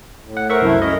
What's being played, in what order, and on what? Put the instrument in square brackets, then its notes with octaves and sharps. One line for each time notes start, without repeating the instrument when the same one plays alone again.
[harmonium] A2
[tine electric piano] F#5
[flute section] A#4 C5 E6 [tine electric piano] E5 F#5 C#6
[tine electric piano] C2 F#2 A3 [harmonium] E4
[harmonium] F#2 [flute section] C#4 E4 C#6 [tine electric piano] D#5